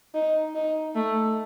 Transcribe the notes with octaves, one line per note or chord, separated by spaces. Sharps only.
D#4
D#4
A3